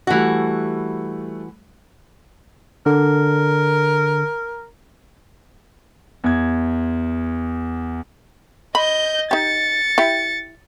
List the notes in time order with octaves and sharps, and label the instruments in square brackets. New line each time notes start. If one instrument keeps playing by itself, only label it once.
[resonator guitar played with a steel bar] E3 F#4 [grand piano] G3 A3 F#5
[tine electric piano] D3 [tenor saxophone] A#4
[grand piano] E2 G#6
[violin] D#5 G6 [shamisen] B5
[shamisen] D#4 G4 [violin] A6 C#7
[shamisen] E4 G4